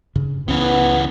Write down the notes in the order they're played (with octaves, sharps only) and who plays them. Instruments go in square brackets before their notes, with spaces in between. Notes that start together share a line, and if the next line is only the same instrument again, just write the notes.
[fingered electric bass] G2 C#3
[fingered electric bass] C#2 C#4 [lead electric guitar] C#3 E3 [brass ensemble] B3